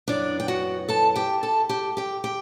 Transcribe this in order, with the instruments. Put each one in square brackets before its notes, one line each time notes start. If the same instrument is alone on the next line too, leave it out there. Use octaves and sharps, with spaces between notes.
[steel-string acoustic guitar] F#2 E3 B3 D4 D5
G5
F#4 F#5
A4 A5
G4 G5
A4 A5
G4 G5
G4 G5
G4 G5